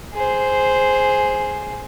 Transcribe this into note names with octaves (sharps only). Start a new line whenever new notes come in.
G#4 C5